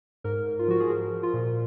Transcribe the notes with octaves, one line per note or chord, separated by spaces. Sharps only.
G#2 A#4
G#2
F4
F3 F#4
G#4
F3 A#4
F3
F4
A#2